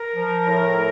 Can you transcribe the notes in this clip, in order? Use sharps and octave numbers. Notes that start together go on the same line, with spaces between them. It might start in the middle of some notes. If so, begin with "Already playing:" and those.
Already playing: A#4
F3
A2
A2